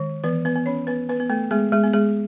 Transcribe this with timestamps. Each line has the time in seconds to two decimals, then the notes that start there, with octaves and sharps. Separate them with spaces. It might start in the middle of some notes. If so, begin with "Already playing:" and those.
Already playing: D#3 G#3
0.24 E3 B3 B4
0.45 B3 B4
0.56 B3
0.66 C#4 C#5
0.87 B3 B4
1.09 B3 B4
1.20 B3
1.30 A3 A4
1.51 G#3 B3 G#4
1.72 G#3 G#4
1.84 B3
1.93 G#3 G#4